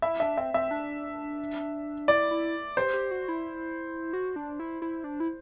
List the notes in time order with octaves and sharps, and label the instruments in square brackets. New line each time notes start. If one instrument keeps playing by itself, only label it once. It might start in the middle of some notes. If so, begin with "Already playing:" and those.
[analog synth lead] E4 [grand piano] E5
[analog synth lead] D4 [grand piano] E5
[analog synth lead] C4 [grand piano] E5
[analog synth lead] C4 [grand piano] E5
[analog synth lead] D4
[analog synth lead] E4 [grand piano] D5
[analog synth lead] E4
[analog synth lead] G4 [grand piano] C5
[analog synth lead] G4
F#4
E4
F#4
D4
E4
E4
D4
E4